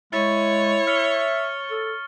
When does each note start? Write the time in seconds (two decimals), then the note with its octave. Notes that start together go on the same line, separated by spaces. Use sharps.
0.13 G#3 E4 C#5 C#6 A6
0.87 E5 F6 C#7 G7
1.71 A4